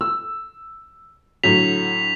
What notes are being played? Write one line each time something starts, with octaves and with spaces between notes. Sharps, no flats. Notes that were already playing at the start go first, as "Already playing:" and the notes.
E6
A2 D3 F#3 B6 F7